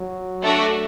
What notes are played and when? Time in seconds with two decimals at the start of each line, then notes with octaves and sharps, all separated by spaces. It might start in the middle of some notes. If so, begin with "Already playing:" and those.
Already playing: F#3
0.42 A3 D4 F#4